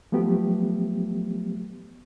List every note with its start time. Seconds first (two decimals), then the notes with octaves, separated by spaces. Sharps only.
0.12 F3 F#3 A3 B3 G4